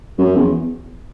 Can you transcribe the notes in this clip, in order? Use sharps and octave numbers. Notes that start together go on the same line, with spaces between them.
F#2
E2